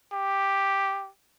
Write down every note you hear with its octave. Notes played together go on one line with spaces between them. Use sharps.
G4